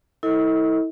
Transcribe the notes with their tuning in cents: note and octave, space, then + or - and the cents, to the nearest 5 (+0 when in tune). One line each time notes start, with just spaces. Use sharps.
E4 -30 A4 +30 D#5 +35